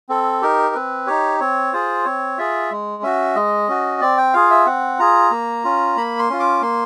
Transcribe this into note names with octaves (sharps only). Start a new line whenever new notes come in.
C4 A4
D#4 G4 A#4
C4 B4
D#4 G4 C#5
C4 C#5
F4 G#4 C5
C4 C#5
F4 G#4 E5
G#3
C#4 F#4 E5
G#3 D#5
C#4 F#4
C4 D5
G5
F4 G#4 F5
E5
C4 F#5
F4 G#4 A#5
A#3
C#4 F4
A#3 B5
C6
C#4 F4
D6
A#3 C6